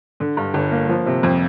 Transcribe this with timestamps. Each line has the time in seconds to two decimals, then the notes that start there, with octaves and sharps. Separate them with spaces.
0.20 D3
0.37 G2
0.54 G1
0.72 A#3
0.89 F3
1.06 C3
1.23 F2